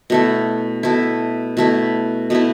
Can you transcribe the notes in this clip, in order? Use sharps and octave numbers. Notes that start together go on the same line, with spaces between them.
B2 A3 E4
B2 A3 E4
B2 A3 E4
B2 A3 E4